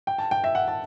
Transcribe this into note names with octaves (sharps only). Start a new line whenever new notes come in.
G5
A5
G5
E5
F#5
A5